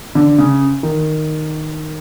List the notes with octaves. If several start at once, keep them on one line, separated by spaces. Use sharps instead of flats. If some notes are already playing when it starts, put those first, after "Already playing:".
D3
C#3
D#3